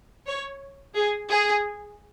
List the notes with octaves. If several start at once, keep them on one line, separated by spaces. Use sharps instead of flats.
C#5
G#4
G#4